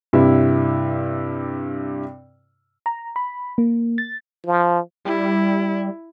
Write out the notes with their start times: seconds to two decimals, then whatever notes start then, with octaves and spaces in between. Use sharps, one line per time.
0.13 G2 C3 E4
2.86 A#5
3.16 B5
3.58 A#3
3.98 A6
4.46 F3
5.05 G3 E4